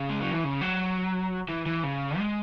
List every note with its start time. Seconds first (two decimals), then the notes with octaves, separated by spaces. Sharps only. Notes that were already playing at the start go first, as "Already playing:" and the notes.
Already playing: C#3
0.09 G#3
0.21 F#3
0.32 E3
0.44 C#3
0.61 F#3
1.48 E3
1.66 E3
1.83 C#3
2.18 G#3